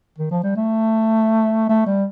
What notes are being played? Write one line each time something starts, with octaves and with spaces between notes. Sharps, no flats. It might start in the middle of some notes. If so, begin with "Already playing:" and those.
D#3
F3
G3
A3
A3
G3